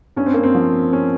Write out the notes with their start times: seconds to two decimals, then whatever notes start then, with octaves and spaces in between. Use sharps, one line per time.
0.16 G2 C#4
0.26 C4
0.34 A#3
0.43 C4
0.55 F3
0.93 C#4